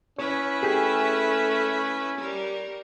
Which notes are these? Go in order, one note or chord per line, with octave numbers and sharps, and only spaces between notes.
C#4 E4 B4 C#5
A3 G4 G#4
G3 A#4